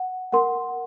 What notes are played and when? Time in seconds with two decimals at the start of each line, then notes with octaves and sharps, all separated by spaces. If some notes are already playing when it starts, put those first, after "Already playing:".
Already playing: F#5
0.32 A#4 F#5 C6